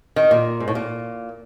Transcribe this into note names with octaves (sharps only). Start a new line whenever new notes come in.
D#3
A#2
G#2
A2
A#2